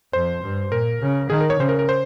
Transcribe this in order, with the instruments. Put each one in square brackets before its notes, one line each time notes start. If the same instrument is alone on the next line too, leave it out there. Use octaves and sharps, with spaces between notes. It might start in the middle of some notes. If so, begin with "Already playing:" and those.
[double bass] F2 [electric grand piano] C5
[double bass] G2
[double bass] A#2 [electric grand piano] A#4
[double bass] C#3
[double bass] D#3 [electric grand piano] G#4
[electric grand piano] A#4
C#5
[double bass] C#3 [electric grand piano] C5
[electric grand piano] A#4
A#4
C5